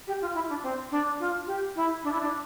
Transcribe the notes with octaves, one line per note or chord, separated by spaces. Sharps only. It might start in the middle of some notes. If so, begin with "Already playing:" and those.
G4
F4
E4
D4
C4
D4
F4
G4
E4
D4
E4
D4